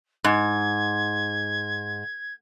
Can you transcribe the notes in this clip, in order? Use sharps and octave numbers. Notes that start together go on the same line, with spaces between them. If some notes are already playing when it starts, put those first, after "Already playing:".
G#2 G#6